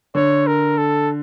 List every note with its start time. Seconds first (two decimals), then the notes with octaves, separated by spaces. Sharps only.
0.15 D3 C#5
0.47 A#4
0.78 A4